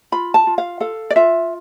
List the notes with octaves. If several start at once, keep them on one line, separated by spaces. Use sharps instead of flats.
F4 B5
A5
F4
F5
A4 F5
D5
F4 E5